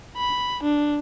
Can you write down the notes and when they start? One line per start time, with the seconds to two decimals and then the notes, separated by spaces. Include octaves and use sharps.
0.17 B5
0.63 D4